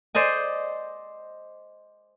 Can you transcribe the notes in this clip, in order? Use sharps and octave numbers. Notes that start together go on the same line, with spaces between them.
C5 D5 D#5 G#5